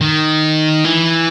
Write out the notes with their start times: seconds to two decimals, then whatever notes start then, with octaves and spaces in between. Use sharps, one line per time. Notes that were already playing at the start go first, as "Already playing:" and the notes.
0.01 D#3
0.85 E3